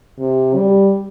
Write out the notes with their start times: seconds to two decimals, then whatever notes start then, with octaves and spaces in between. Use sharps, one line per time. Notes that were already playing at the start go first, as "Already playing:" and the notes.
0.19 C3
0.55 G3